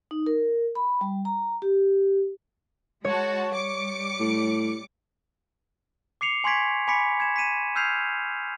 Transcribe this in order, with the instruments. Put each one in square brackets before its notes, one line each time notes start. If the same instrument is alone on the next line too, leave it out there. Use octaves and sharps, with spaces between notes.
[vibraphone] D#4
A#4
B5
G3
A#5
G4
[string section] G#3 F#4 A5 [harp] C#5
[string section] G3 D6 C#7
[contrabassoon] A2
[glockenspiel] D6 C7 C#7 F7
G#5 C6 C#6 G#6 B6 D7
G#5 B5 D6 B6 C#7
G#6 E7
B6 C#7 D#7 E7
E6 F6 G6 G#6 C7 F7